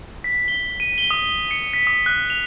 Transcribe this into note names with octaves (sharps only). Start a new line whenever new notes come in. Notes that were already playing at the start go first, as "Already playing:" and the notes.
B6
G7
D#7
G7
D#6
G7
C#7
B6
D#6
F#6
F7